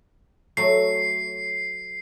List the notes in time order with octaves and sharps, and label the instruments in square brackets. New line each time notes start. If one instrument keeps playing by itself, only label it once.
[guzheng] F#3 A3 [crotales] C7